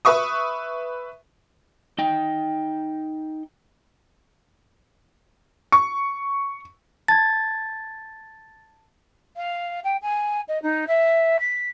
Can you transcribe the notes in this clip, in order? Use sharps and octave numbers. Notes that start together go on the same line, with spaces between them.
B4 E5 C#6 D#6
D#4 G5
C#6
A5 G#6 A6
F5
G5
G#5
D#5
D#4
E5
B6